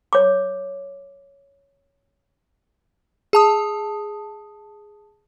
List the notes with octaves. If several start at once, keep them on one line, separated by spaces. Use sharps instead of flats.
C#5 D6
G#4 A5 D#6